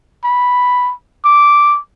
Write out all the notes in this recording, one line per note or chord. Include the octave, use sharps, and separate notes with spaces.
B5
D6